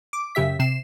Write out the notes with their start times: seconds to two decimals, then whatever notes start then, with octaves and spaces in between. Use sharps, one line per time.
0.13 D6
0.35 F#2 C#3 G4 E5 B6
0.59 C3 C7 E7